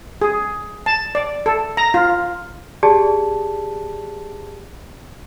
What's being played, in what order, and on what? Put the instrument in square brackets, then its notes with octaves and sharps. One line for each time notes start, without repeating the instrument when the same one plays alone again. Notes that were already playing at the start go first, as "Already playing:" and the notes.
[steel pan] G#4
A5
D5
A4
A#5
F4
[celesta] G4 G#4 D5 A5